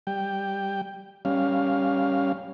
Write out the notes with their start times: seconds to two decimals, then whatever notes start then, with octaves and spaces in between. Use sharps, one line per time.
0.07 G3 G5
1.25 G3 C#4 F5